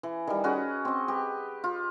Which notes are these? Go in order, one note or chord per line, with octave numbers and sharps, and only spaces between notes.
E3
D#3 G3
C#4 F#4 G#4 B4
C4 D#5
G4 B4
F4